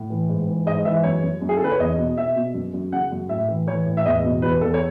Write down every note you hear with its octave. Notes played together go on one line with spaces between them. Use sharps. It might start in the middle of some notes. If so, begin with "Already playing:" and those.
Already playing: A2
E3
G#2
E3
G#2 D#5
E3 E5
F#2 C#5
F#2
F#2
G#4
A4
C#3 B4
C#5
E2 D#5
B2
B2 E5
B2
F#2
F#2
C#3 F#5
F#2
A2 E5
E3
E3 C#5
A2
E5
E2 D#5
B2
E2 B4
E2 A4
C#5